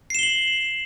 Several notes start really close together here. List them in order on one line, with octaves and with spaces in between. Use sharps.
C7 E7 G7 F#7